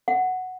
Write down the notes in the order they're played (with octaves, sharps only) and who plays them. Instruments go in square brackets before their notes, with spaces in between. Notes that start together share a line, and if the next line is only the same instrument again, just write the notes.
[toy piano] F#5